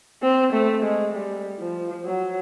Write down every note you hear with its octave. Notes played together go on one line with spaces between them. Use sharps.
C4
A3
G#3
G3
F3
F#3